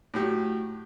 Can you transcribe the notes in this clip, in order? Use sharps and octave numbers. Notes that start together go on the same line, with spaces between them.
A2 F#3 G4